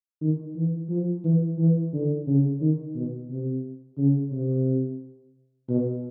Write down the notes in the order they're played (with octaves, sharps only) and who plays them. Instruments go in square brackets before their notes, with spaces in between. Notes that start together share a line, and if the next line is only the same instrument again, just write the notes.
[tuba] D#3
E3
F3
E3
E3
D3
C#3
D#3
B2
C3
C#3
C3
B2